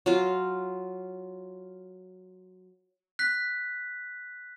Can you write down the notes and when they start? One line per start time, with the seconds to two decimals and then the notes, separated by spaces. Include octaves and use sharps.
0.06 F#3 F4
3.19 F#6 B6